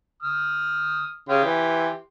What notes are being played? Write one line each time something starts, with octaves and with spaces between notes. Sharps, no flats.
D#6 F6
C#3 G4 C6
E3